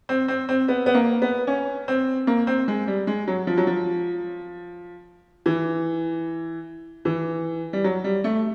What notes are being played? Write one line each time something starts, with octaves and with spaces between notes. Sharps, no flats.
C4
C4
C4
B3
B3
A#3
B3
C#4
C4
A#3
C4
G#3
G3
G#3
F#3
F3
F#3
F3
E3
E3
G3
F#3
G3
A3